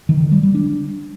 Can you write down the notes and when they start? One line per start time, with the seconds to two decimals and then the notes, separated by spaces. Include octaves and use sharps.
0.09 D#3
0.20 D3
0.32 G3
0.43 G3
0.55 D4